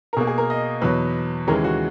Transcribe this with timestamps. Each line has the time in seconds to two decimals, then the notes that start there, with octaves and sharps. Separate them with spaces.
0.13 A#4
0.17 B2 G#4
0.20 A#3
0.27 G#4
0.38 A#4
0.50 D#5
0.81 E2 B2 F#3 B4
1.47 D#2 C#3 E3 G#3 A#4
1.64 F#4